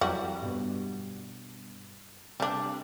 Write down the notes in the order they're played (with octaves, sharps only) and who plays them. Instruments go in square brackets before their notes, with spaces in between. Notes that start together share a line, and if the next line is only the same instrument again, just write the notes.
[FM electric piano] F2 E3 F#3 [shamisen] G3 F#4
[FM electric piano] G2 B2
[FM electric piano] C3 [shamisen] G3 D4